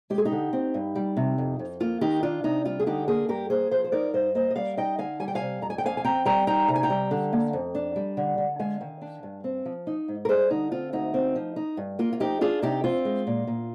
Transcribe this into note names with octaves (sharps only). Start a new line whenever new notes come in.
G#3 G4
G#4
D#4 G4
D3
C4
G2
G3
C3
F2
F2
A#3 F4
D#3 D#4 G4
D4 F4
C3 D#4
G3 F4
G#4
D3 D#4 G4
A#3 F4 G#4
G2 G4 A#4
A#3 G#4 C5
F3 G#4 C5
C5
D#4 A#4 D5
G2 C5 D#5
A#3 C5 D#5
D#5
G3 D5 F5
D#4 D#5 G5
D3 F5 G#5
G3 G#5
G5
F5 G#5
C3
F2 A#5
G#5
G5
F2 F5 G#5
G#5
C4 G5 A#5
G3 G5 A#5
D#4 G5 A#5
C3 A#5
G#5
G5 A#5
G3
D3
A#3
F2
D4
G3
D3
D3
G#3 F5 G#5
D#3
D4
G2
C4
F3
D#4
G#2
A#4
G3 G#4 C5
D3 D#4
C4 F4
D2 D#4
C4
F3
D#4
G2
A#3 F4
F4
F3 D#4 G4
D4 F4 G#4
C3 D#4 G4
C4 F4
G#3
A#2
A#2